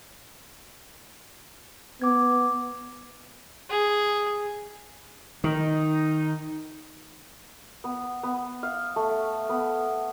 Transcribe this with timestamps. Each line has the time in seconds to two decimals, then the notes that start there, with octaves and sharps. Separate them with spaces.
2.02 B3 D6 G#6
3.69 G#4
5.44 D#3 D#4
7.84 B3
8.23 B3
8.63 F5
8.96 A3
9.49 B3